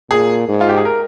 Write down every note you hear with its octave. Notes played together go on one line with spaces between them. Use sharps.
A#2 G#4
G#2
F4
G4
G#4
A#4